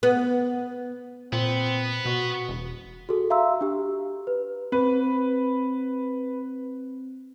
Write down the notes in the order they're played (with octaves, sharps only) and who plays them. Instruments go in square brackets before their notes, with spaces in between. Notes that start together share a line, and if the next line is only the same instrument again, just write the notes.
[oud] B3
[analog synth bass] A#2 [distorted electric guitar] B3 [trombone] C4
[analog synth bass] B2 [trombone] F#4
[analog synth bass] E1
[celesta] F#4 G#4 A4
F#4 E5 F5 A#5 C6 E6
D4 G4
B4
[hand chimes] C4 [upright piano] B4